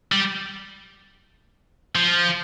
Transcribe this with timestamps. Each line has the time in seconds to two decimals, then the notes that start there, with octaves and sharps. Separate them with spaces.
0.12 G3
1.95 F3